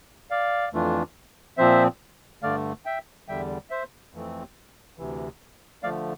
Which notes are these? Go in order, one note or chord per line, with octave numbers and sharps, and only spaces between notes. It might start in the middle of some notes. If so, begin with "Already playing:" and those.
D5 F5
F2 E3 A3 D4 F4
A#2 F3 C4 C5 E5
G2 D3 A3 D5 F5
E5 G5
E2 D3 G3 E5 G5
C5 E5
F2 E3 A3 C4
D2 C3 E3
D3 F3 A3 D5 F5